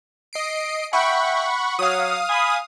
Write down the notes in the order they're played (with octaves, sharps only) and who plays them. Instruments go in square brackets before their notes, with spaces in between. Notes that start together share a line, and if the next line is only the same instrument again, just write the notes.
[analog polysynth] D#5 C7 D7
[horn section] E5 G5 [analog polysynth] F#5 B5 C#6
[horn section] F#3 [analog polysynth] F5 D#6
[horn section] G#5 B5